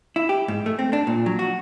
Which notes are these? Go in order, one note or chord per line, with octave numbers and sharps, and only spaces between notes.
E4
G4
G#2
A3
C4
D4
A#2
F#3
F#4